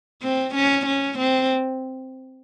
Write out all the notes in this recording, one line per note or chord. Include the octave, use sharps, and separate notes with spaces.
C4
C#4
C#4
C4